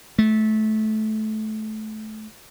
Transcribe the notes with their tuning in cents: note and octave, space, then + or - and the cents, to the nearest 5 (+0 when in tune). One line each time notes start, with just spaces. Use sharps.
A3 -20